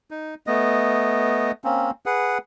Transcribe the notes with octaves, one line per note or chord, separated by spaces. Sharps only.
D#4
A3 B3 D#5
A#3 C4 C#4
G#4 B4 F#5